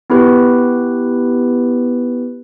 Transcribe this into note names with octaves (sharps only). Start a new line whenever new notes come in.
B3 E4 G4 B4